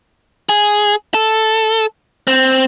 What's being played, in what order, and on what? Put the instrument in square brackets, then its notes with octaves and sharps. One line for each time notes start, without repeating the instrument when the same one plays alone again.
[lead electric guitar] G#4
A4
C4